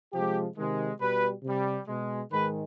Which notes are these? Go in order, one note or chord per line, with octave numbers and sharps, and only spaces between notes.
C3 F3 G#3 G4
C3 D#3 G#3
B2 G3 B4
C3 G3
B2 G#3
G#2 D#3 G#3 B4